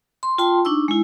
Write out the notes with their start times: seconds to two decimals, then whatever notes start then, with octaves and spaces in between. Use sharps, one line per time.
0.23 C6
0.38 F4 G5 A5 C6
0.65 D4 D#4 C#6 E6
0.88 G#3 E4